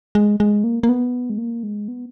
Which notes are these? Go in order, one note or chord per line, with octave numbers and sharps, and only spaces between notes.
G#3
G#3
A#3
A#3
B3
G#3
A#3
G#3
B3